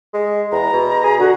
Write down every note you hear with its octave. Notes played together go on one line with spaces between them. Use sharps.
G#3
E2 A#5
B2
G#4
D3 F#4